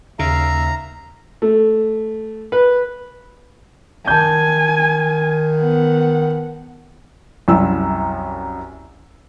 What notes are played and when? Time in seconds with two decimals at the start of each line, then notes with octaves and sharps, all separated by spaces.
0.19 D#2 C#3 E5 F5 A#5
1.42 A3
2.52 B4
4.08 D#3 G#5 A5 G6
5.57 B3 F#5
7.48 C2 F#2 E4 E6